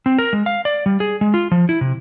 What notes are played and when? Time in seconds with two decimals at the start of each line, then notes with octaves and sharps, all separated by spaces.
0.06 C4
0.18 A#4
0.33 G#3
0.46 F5
0.65 D5
0.86 G3
1.00 G#4
1.21 G#3
1.34 F4
1.51 F3
1.69 E4
1.81 C3